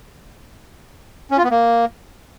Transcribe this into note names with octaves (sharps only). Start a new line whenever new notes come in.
C#4
F4
B3
A#3